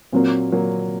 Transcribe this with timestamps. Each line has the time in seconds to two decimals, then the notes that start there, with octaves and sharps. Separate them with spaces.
0.12 A#2 F#3 A#3 C4
0.52 A#2 F#3 A#3